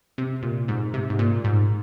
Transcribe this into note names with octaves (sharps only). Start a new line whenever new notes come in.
C3
A#2
G#2
C3
G#2
A#2
G#2